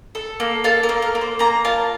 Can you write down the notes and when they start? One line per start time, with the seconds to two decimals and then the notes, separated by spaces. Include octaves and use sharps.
0.15 A4
0.40 A#3
0.64 A4 F5
0.83 A#4
0.89 A#3
1.02 A#4
1.15 A#3
1.21 C5
1.39 A#3 A#5
1.65 F4 A5